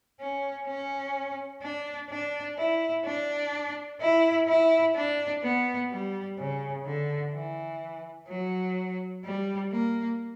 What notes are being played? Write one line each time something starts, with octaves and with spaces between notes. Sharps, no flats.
C#4
C#4
D4
D4
E4
D4
E4
E4
D4
B3
G3
C#3
D3
E3
F#3
G3
A#3